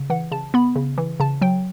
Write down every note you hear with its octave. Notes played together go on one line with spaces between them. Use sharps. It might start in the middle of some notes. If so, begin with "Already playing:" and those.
Already playing: C#3
E3 F#5
C#3 A5
B3 B5
C#3
E3
C#3 A5
F#3 G5